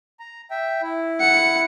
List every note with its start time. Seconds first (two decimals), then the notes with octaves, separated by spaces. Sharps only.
0.20 A#5
0.51 E5 G5
0.82 E4
1.20 F#5 C#7